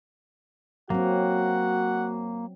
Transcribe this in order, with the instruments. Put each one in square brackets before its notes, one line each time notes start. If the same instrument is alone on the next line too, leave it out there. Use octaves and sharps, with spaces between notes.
[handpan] F#3 C4 [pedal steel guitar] A#3 [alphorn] F#4 [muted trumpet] F#5